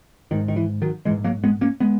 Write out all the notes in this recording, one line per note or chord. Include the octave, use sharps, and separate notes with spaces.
G#1 G#2 D#3
D#3
E3
D#3 F#3
A#1 G#2 E3 G#3
F#3 A#3
G#3 B3
A#3 C#4
G#3 B3